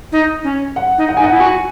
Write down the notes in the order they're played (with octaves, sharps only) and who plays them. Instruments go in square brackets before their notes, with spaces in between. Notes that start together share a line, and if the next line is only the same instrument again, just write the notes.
[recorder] D#4
C#4
[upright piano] F#5
[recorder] D#4
[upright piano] F#5
[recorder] D#4 [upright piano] G#5
[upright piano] F#5
[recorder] E4
[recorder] F#4 [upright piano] G#5